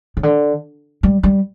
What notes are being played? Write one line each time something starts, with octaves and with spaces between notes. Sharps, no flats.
C#3
D3
G3
G3